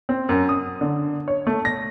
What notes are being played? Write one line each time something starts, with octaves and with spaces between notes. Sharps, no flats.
C4
F#2
D#6
D3
C#5
A3
A#6